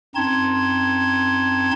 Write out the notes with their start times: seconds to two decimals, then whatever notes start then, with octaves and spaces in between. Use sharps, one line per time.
0.15 F#2 C4 D#4 A5 C6 G#6